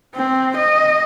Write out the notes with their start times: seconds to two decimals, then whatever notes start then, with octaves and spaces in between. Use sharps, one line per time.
0.15 C4
0.57 D#5